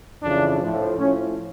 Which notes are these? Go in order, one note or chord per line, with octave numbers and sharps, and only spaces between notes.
F2 C#3 E3 D4
A2 F3
A2 F3 C#4